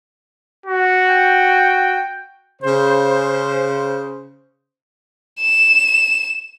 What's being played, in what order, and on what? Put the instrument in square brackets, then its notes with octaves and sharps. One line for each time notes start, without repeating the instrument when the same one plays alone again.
[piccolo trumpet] F#4
[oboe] G5
[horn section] C#3 C5
[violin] E7